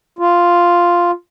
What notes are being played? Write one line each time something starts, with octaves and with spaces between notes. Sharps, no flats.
F4